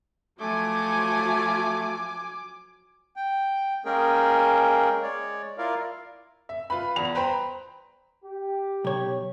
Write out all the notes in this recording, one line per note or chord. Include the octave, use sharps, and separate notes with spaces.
F3 F#3 A3 G#5 D6
G5
G#3 A#3 C#4 G#4 A#4 G5
G#3 C#5 D5
E4 F4 A#4 D5 F5
E5
F4 B4 B5
E2 F7
B4 C5 G5 A#5 B5
G4
B1 C#5